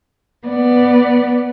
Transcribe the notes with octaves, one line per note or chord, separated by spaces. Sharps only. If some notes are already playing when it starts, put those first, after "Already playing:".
B3 D5